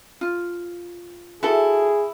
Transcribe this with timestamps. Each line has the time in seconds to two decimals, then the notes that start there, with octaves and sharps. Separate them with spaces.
0.21 F4
1.43 E4 F#4 G#4 A4